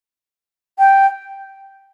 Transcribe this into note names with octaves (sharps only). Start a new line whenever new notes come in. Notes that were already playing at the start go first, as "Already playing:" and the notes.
G5